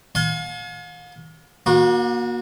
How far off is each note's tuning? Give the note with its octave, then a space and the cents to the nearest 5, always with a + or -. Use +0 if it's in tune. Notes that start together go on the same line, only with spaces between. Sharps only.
F5 +40 G#5 +45 C6 +0
A#3 +30 F#4 -25